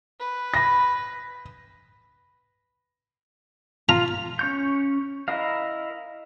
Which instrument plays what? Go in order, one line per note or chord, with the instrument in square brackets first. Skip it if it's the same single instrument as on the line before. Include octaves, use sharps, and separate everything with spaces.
[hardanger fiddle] B4
[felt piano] B5 A#6
[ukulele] F4 [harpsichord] A#5
[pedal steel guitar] C#4 C#6 G6
E4 A#4 D#5 F5